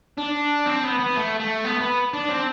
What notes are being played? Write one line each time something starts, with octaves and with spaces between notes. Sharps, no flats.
D4
C4
B3
B3
A3
A3
B3
B3
D4
C4